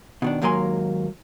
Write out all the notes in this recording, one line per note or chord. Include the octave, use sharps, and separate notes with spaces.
B2 D#3 D4
D#2 G#2 F#3 A#3 G#5 C6